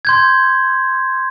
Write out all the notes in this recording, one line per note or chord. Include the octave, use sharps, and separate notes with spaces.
C6 G6 G#6